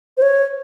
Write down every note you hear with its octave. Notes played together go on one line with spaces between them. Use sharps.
C5
C#5